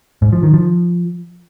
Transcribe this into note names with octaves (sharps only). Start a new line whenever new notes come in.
G#2
F3
D#3
F3